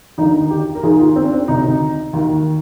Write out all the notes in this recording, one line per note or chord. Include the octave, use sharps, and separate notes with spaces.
D#2 D3 D#4
G4
A#4
D#2 D#3 G#4
F4
C4
D4
C4
D2 C3 D#3 D#4
D#2 D#3